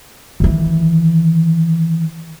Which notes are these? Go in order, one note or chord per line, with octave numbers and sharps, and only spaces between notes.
D#3 E3